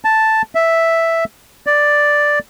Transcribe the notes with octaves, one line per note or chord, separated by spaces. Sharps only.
A5
E5
D5